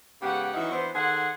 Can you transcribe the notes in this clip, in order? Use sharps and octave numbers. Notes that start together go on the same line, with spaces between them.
G#2 C#3 B3 G4 F#5
E3 F#3 C#4 D#4 E4 F#4
E3 B3 D4 C5
D#3 G#4 A4 C5 F#5